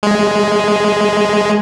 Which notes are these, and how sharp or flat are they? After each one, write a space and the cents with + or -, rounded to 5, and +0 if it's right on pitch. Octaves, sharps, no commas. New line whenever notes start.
G#3 +5